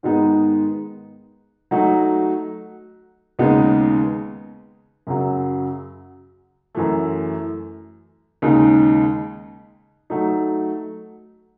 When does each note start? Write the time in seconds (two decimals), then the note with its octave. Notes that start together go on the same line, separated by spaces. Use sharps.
0.03 G#2 D#3 G#3 B3 D#4
1.71 F#3 A3 D#4 F#4
3.39 D#2 C#3 G#3 B3 D#4
5.07 F#2 C#3 F#3
6.75 F#2 E3 A3
8.42 D#2 C#3 G#3 D#4
10.10 F#3 A3 D#4